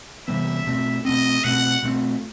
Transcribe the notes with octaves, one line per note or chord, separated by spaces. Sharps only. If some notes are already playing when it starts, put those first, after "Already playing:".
C3 E3 G3 B3 E5
B2 A3 C4
B2 A3 C4 D#5
B2 A3 C4 F#5
B2 A3 C4